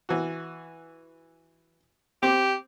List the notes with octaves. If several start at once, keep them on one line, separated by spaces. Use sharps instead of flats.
E3 F#4
C4 G4 D6